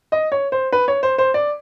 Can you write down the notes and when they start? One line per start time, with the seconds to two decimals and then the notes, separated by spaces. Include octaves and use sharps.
0.12 D#5
0.32 C#5
0.52 C5
0.72 B4
0.88 C#5
1.03 C5
1.18 C5
1.34 D5